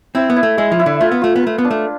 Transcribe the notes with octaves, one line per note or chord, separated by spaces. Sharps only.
C4 E4
B3
E4
A3
G#3 E5
F3
E4
D3
A3 F4
B3
A3 F4
B3
A3 B4
B3
D4
A3